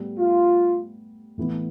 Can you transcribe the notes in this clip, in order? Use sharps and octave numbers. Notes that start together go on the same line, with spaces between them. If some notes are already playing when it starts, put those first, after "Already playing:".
Already playing: A2 G3 B3
F4
A2 E3 B3